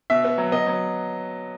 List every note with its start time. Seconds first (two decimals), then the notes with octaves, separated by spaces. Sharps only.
0.10 B2 E5
0.25 B3
0.38 F#3
0.52 B3 D#5
0.67 F#3